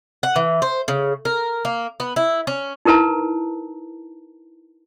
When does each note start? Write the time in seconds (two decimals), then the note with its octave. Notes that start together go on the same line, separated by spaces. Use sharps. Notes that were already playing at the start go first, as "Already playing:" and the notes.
0.23 F#5
0.36 E3
0.62 C5
0.88 C#3
1.25 A#4
1.65 A#3
2.00 B3
2.16 E4
2.47 C#4
2.85 D#4 E4 A#4 B4 A5 A#5